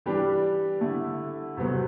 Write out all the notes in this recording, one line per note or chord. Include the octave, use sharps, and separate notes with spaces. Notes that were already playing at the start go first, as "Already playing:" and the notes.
E3 G3 D4 G4 B4
D3 A3 E4
E2 C3 F#3 B3